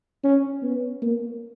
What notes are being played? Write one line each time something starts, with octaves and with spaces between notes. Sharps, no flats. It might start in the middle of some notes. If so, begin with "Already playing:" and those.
C#4
B3
A#3